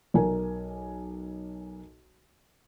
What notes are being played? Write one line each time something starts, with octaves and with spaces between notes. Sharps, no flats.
B1 A#4 G#5